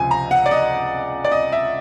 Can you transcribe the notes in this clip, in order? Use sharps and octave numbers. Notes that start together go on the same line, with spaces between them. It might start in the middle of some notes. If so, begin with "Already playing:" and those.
Already playing: C#2 C3 F3 G#5
A#5
F#5
D5
D#5
D5
D#5
E5